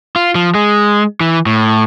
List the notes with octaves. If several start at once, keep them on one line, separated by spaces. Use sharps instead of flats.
F4
F3
G#3
E3
A2